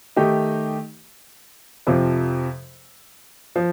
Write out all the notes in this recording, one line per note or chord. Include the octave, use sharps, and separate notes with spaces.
D#3 A3 D#4 G4
F2 C3 F3
F3